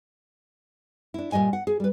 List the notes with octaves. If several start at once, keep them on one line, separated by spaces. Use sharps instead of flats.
D4 E4
A#2 F3 G3 D#5 G#5
F#5
G#4
G3 B4